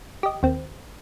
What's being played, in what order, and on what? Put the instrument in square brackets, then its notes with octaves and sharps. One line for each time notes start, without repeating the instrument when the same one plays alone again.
[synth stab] G4 D#5
D#2 C4